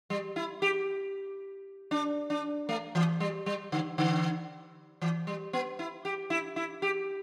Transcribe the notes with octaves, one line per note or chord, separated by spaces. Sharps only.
G3
E4
G4
D4
D4
A3
E3
G3
G3
D3
D3
E3
G3
B3
E4
G4
E4
E4
G4